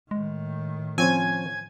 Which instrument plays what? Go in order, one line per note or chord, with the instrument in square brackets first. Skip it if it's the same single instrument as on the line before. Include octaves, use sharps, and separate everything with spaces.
[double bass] A2 D#3 [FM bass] G#3
[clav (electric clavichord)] F3 C#4 C5 [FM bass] C4 [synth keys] G#5 G#6